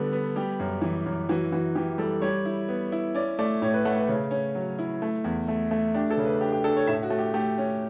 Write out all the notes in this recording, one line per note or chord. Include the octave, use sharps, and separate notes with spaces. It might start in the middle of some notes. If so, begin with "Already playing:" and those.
Already playing: D3 G3 B3 A4
B3
G3 G4
F#2
E3
F#2
E3 F#4
E3 F#4
E3 G4
G3 A4
G3 C#5
E4
B3
E4
C#4 D5
A3 D5
A2 C#5
B4
A3 F#5
B4
C#3
C#4
F#3
E4
A3
E2
A3
A3
D4 G4
A4
C#3
B4
D4 G4
G4
D4 A4
C#5
A2 E5
F#4
A3
G4
A3 G4
C#4